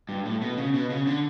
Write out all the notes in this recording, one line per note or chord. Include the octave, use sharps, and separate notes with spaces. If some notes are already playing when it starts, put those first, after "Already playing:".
G2
A2
B2
C#3
B2
C#3
D3